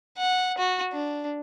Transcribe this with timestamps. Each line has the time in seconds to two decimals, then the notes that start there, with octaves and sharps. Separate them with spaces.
0.18 F#5
0.58 F#4
0.93 D4